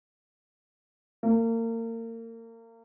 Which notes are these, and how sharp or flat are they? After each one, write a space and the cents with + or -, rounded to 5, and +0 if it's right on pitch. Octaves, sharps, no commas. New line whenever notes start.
A#3 -35